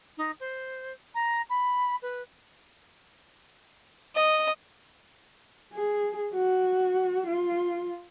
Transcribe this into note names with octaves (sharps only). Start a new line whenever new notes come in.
D#4
C5
A#5
B5
B4
D#5
G#4
F#4
F4